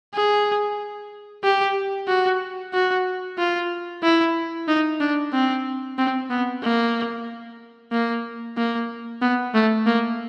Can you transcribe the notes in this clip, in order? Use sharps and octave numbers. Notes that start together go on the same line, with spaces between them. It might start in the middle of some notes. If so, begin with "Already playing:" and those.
G#4
G4
F#4
F#4
F4
E4
D#4
D4
C4
C4
B3
A#3
A#3
A#3
B3
A3
A#3